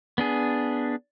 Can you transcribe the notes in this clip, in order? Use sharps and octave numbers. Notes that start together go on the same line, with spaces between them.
B3 D4 G#4